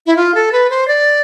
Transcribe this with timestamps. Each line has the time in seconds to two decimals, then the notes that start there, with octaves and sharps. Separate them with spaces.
0.06 E4
0.17 F4
0.34 A4
0.52 B4
0.70 C5
0.88 D5